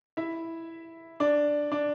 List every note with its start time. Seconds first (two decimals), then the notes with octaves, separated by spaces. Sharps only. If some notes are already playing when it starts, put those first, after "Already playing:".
0.17 E4 E5
1.20 D4 D5
1.72 D4 D5